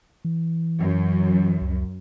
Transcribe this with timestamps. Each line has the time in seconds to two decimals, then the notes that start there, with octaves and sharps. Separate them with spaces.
0.25 E3
0.79 F#2
1.61 C#2